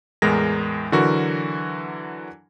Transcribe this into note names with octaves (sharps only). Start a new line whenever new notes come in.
E2 A2 G#3 A#4 A#6
D3 E3 F#3 F#4 A#4